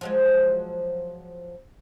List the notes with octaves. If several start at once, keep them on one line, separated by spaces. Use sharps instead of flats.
F3 F#3 G#3